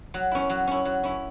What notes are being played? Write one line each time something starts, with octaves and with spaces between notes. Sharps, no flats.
F#3
C#4 E4
F#3
C#4 E4
F#3
C#4 E4